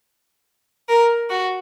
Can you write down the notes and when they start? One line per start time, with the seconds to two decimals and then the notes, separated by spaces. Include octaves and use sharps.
0.89 A#4
1.30 F#4